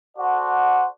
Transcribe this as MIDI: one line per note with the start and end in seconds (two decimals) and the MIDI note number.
0.17 0.86 66
0.17 0.86 69
0.17 0.86 72
0.17 0.86 74
0.17 0.86 78